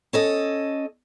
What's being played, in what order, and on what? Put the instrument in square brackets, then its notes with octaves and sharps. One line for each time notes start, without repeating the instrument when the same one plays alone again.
[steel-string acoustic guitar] C#4 A4 D#5